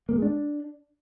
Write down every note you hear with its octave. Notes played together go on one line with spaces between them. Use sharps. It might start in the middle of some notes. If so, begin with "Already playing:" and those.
A#3
G#3
D4